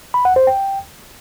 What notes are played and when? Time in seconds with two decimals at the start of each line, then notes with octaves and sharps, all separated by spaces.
0.14 B5
0.25 F#5
0.36 C5
0.47 G5